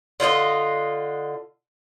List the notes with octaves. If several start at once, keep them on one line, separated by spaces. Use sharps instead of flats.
D3 F4 C#5 D#5